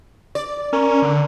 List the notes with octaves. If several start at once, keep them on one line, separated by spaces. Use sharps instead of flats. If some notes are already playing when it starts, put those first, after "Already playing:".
D5
C#4 A#4
D3